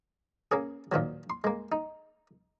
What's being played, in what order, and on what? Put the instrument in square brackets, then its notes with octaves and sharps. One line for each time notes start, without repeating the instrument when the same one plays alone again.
[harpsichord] A#3 C#4 G#4
A#2 D#3 F3 F#3
C6
G#3 A#3
D#4